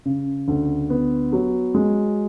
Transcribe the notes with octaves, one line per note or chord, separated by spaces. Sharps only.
C#3
D2
B3
F#3
G#3